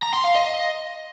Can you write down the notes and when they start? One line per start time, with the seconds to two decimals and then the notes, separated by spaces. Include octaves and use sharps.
0.02 A#5
0.13 C6
0.24 F5
0.35 D#5